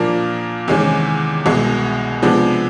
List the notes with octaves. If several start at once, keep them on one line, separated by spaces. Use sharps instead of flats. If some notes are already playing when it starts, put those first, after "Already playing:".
Already playing: A#2 F3 A#3 D4
E2 C3 D#3 G#3 C#4
C2 B2 G#3
C3 F3 G#3 B3 D4